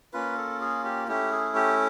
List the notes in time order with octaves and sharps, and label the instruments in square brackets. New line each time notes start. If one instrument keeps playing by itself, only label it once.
[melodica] A#3 C#4 F4 B4
A4
G#4
G4
A3 C#4 E4 G4
G#4
G4